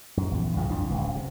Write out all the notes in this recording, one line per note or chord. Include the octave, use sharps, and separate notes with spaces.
F#2
A#1 E2
A#1 G2 C#3 F3
B1 F2 E3 D4
D1 C#2
C3